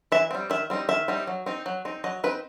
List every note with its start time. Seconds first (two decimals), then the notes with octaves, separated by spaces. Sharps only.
0.12 E3 E5
0.31 G3 C4
0.50 D#3 E5
0.70 G3 C4 D#4
0.89 D#3 E5
1.08 G3 C4 D#4
1.27 F#3
1.46 C4 D#4
1.66 F#3
1.85 C4 D#4
2.04 F#3 D#5
2.24 C4 D#4 B4